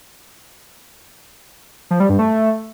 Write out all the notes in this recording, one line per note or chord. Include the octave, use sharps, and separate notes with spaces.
F3
G3
G2
A3